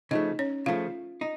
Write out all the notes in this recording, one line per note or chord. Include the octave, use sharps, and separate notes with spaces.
C#3 F3 A3 D#4 D#5
C#4 C#5
C#3 F3 A3 F4 F5
D#4